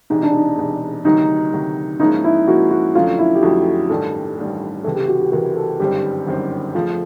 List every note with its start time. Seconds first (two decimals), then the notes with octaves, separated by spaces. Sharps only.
0.10 E1 E2 C3 D#4
0.23 D4
0.34 D#4
0.57 E1 E2 C3
1.04 D2 C3 D#3 F#3 D#4
1.53 D2 C3 D#3 F#3
2.00 G#2 F3 A#3 C#4 D#4 E4
2.24 E4
2.47 G#2 F3 A#3 C#4 E4 F#4
2.71 F#4
2.95 F2 D3 F#3 A3 C#4 F4
3.19 E4
3.35 G4
3.42 F2 D3 F#3 A3 C#4 F#4
3.90 A1 G2 D#3 G3 A4
4.38 A1 G2 D#3 G3
4.84 C#2 C3 E3 A4
4.96 G4
5.08 F#4
5.20 G4
5.32 C#2 C3 E3 A#4
5.56 A4
5.79 G1 F#2 D#3 G3 C4 G4
6.27 G1 F#2 D#3 G3 C4
6.74 F2 C#3 F3 A3 F4